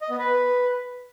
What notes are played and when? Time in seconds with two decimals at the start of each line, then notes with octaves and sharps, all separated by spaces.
0.01 D#5
0.10 B3
0.19 B4